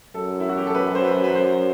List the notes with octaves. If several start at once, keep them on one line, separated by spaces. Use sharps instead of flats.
F#2 A4
E4
F#4
G4
A4
B4
C5
B4
B4
C5